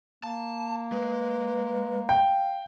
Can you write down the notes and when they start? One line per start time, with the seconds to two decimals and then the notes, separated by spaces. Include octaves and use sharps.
0.24 A#3 A5
0.92 G#3 B4
2.09 F5 G5